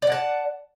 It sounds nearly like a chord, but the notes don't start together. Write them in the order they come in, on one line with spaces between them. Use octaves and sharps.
D5 F#5 A5